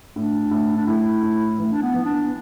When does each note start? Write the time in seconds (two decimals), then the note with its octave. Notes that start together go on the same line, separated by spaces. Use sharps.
0.16 A2 D4
0.51 A2
0.77 D4
0.87 A2 E4
1.23 A2
1.58 E3 A3
1.72 D4
1.82 B3
1.94 E3
2.05 D4